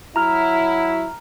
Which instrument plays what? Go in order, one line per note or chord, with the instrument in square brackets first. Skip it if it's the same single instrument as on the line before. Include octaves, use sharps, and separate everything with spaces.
[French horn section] F#3 E4 [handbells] A#5 F6